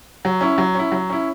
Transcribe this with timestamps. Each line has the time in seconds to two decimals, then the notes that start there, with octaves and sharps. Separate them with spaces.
0.25 F#3
0.41 C#4 E4
0.58 F#3
0.75 C#4 E4
0.92 F#3
1.10 C#4 E4